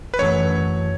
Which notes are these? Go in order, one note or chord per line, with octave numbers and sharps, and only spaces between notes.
B4
F#2 E3 A3 C#4 C#5